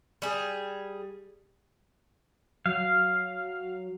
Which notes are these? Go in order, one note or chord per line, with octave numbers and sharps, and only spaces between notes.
G3 G#4
F#3 F5